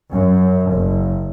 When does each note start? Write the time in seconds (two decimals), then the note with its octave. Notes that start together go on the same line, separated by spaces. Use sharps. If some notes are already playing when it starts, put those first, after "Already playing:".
0.12 F#2
0.71 F#1